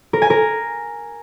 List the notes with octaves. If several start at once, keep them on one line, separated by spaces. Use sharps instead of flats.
A#4
G#5
A#4